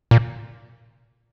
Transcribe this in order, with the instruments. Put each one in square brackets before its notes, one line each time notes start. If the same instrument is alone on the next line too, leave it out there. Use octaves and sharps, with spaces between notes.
[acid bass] A#2